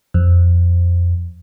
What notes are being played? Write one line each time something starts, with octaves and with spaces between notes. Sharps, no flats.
F2